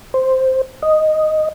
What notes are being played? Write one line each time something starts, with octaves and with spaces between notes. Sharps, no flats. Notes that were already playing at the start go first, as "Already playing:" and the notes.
C5
D#5